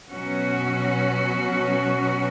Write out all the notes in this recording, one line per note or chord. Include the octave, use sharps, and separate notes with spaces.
B2 F#3 C#4 F#4